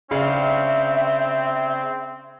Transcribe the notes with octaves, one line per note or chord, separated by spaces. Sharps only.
C#3 C4 D4 E5 F5